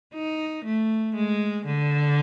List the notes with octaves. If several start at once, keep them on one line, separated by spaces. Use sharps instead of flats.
D#4
A3
G#3
D3